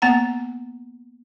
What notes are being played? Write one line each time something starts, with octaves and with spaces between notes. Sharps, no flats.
A#3 B3 F#5 A#5